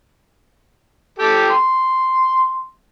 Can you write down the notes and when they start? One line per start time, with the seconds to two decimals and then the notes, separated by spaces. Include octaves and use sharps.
1.19 G4 A4 G5
1.50 C6